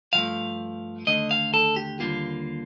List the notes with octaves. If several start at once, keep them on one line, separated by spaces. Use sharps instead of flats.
G2 F3 A3 F5
D#2 D3 A3 D#5
F5
A4
G4
D#2 D3 G3 A#3 F4